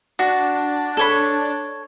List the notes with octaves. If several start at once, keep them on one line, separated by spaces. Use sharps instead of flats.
D4 F#4
A4 C#5 B5